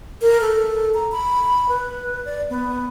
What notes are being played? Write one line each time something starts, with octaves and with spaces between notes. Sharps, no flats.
A#4
A4
A#5
B5
B4
D5
B3